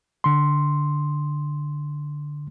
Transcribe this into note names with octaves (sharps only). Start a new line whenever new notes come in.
D3 C6